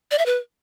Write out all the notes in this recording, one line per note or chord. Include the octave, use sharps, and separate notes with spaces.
D5
E5
B4